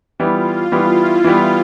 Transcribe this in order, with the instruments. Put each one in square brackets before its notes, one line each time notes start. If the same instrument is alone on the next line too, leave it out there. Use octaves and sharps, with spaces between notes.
[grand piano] E3 G3 B3 [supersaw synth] F4
[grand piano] E3 G3 B3 [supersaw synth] E4
[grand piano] E3 G3 B3 [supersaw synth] F4